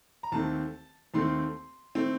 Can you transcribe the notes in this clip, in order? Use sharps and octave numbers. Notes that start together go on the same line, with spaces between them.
A#5
D#2 D#3 A3 C4 A5
D#2 D#3 A3 C4 C6
D#3 A3 C4